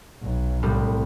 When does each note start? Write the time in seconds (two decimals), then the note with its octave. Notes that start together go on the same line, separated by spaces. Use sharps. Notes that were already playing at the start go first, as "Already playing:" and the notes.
0.22 B1
0.63 C2 A2 G3